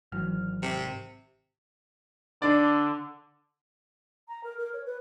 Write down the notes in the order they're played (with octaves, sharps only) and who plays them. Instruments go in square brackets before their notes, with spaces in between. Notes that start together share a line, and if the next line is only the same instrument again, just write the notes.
[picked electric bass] G#1 [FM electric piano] E3 F#3 F6
[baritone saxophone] C3
[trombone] D3 [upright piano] D4 D5
[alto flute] A#5
A#4
A#4
C#5
B4